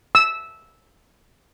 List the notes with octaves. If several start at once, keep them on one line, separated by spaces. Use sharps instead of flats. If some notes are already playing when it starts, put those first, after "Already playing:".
E6